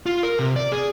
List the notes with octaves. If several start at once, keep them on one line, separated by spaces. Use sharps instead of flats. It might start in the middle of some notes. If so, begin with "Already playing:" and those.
F4
A#4
C3
D5
G#4